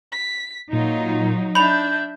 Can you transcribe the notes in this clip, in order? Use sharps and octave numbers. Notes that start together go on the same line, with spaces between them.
B6
A#2 F#3 D#4 F4
D4 E5 B5 G6 F7